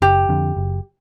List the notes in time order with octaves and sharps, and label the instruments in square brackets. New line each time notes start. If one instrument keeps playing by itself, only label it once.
[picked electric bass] F#1 [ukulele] G4
[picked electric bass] F2 D3
F#1